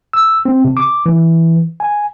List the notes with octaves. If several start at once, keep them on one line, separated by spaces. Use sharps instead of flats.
E6
C4
C3
D6
E3
G#5